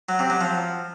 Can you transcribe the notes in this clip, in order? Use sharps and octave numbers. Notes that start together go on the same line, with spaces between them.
F#3
C3
F#3
F3